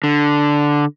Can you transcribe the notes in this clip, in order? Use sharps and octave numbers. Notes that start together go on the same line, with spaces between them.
D3